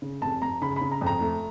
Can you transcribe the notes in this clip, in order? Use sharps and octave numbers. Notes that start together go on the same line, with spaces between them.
C#3
F1 A5
F1 A#5
C#3 B5
C#3 B5
A#5
F2
A#5
A3